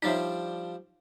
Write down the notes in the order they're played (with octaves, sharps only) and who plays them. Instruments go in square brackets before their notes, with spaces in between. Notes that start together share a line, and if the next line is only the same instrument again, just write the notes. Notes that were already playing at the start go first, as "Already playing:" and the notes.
[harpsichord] F3 G3 D4 [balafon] D#4 C#5 E5